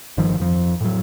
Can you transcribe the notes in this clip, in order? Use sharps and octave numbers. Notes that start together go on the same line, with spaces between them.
G1 G2 D#3 F3
F2 F3
A2 F#3